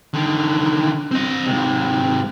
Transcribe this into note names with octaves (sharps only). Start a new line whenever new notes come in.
D3 D#3
C4 D#5
G#2 C3